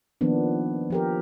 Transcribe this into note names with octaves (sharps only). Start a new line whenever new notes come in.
D#3 F3 A#3 B3 D4
F3 G4 A#4